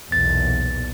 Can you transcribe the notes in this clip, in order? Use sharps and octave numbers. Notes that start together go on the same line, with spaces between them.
B1 E2 A#2 A6